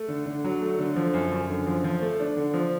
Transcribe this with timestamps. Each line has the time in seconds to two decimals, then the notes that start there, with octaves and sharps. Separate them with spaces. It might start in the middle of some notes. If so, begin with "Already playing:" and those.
Already playing: A3
0.08 D3
0.26 D3
0.44 F#3
0.61 A3
0.79 D3
0.96 F3
1.14 F#2
1.32 F#2
1.50 D3
1.67 F3
1.84 F3
2.02 A3
2.20 D4
2.37 D3
2.54 F3